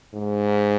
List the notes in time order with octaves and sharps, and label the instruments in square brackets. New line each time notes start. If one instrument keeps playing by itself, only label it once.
[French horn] G#2